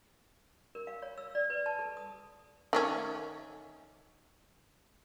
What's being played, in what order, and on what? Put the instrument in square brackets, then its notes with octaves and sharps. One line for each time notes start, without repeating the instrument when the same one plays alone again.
[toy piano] A#4
F5
C#5
E6
D5
B4
A5
A4
D#6
[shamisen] D#3 A3 C#4